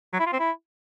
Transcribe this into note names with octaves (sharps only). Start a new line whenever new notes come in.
F#3
E4
F4
C4
E4